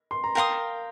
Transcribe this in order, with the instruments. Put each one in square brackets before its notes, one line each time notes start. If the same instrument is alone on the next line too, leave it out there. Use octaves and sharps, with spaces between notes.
[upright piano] C6
A#5
[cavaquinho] A#4 F5 C6 D#6 [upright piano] G5